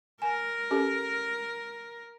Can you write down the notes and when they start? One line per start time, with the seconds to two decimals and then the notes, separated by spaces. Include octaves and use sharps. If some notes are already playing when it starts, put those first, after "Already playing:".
0.22 A#4 G#5
0.71 C#4 G4 A4